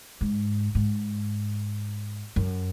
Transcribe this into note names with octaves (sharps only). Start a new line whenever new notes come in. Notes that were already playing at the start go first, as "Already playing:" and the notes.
G#2
G#2
F#2